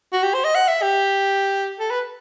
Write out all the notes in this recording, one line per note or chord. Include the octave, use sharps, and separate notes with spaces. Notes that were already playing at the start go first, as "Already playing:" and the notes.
F#4
G4
C5
D#5
F#5
E5
G4
A4
B4